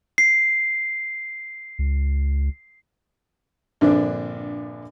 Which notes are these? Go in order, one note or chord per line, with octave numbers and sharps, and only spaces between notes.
C7
C#2
A#1 G2 D3 C4 D4